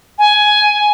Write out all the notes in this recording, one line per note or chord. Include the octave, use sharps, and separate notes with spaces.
G#5